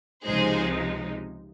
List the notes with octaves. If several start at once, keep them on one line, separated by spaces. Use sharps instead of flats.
C#2 C3 F3 G#3 D#4 G#4 C5